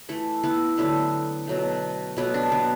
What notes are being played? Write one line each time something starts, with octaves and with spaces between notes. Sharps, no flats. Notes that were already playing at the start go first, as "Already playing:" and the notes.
E3 A3 E4 A4
B3 E4
D3 F#3 A3 B3 E4
B2 F#3 A3
B2 F#3 A3 B3
D4
B3